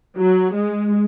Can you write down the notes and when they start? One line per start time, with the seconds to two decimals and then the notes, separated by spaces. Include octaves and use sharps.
0.17 F#3
0.55 G#3